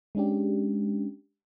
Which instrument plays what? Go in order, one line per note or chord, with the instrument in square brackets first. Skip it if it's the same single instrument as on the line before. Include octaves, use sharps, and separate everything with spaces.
[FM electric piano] G#3 C#4 D4 G4